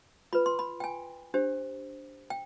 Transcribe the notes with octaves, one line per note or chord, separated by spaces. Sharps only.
F4 B4 B5
C6
B5
G5
G#5
D4 G4 C5
G5